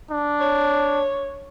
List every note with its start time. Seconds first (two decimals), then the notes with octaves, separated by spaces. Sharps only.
0.11 D4
0.40 C#5